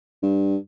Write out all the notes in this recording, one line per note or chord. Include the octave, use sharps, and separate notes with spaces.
G2